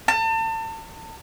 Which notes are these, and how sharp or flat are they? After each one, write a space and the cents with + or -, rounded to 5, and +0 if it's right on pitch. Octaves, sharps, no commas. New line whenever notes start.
A5 +35